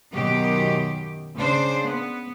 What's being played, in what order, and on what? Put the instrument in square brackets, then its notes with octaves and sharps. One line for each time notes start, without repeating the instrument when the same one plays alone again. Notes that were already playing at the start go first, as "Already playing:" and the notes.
[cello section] F#2 B2 D#3 G4
C#3 D4 C5
B3